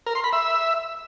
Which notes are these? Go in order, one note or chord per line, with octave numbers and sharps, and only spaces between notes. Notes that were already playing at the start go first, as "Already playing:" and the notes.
A#4
C6
B5
E5